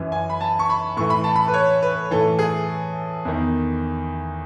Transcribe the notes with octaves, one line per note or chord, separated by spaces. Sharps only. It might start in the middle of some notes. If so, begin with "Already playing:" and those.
Already playing: F#2 E3
G#5
B5
A5
C#6
B5
A2 E3 C#6
B5
A5
B5
B4
C#5
B4
A2 E3 A4
G#4
E2 D#3